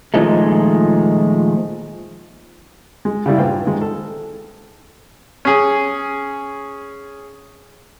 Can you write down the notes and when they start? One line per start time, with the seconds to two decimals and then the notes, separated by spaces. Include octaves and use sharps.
0.14 A#2 D#3 F3 G#3 A3
3.05 G#3
3.26 C#3 G3 E4
3.38 G2 A#2 C5 F5 G5
3.65 D#3 G#3
3.81 A4
5.45 C#4 G#4